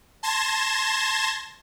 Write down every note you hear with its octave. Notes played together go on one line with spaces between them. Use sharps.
A5 C6 G#6 A#6 E7